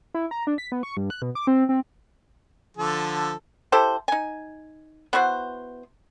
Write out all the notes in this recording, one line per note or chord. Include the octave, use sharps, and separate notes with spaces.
E4
A#5
D4
B6
B3
C#6
G2
F#6
B2
D6
C4
C4
D3 F3 A4
E4 G4 A4 C5
D#4 G#5
B3 E4 F#4 C5